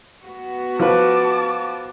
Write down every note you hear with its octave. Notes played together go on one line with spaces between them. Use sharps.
B3 F#4
F3 B4 A5 D6